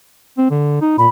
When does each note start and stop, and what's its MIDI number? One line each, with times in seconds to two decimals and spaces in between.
0.38 0.46 60
0.51 0.81 50
0.81 0.97 63
0.98 1.07 46
0.98 1.09 83